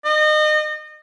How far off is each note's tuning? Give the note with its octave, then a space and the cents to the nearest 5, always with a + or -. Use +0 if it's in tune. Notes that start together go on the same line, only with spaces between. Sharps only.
D#5 -30